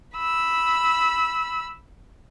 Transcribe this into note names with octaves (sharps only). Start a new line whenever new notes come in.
B5 E6